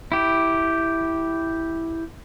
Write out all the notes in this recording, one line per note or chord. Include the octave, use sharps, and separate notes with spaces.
E4 G4